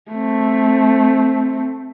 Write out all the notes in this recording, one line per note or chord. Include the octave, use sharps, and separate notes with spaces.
A3 C4